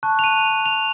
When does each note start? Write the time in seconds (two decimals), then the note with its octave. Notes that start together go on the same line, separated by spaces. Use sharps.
0.03 A5 C#6 F#6
0.19 F7
0.24 D#7
0.66 F7